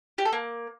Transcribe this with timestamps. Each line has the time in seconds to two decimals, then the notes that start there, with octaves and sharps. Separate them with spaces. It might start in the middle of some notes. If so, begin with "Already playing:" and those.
0.18 G4
0.25 A4
0.33 A#3